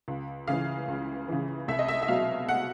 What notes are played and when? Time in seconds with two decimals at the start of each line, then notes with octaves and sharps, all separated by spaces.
0.08 C#2
0.48 C#3 E3 F5
0.88 C#2
1.28 C#3 E3
1.68 C2 E5
1.79 D#5
1.88 E5
2.02 E5
2.08 B2 F#3 F5
2.49 F#5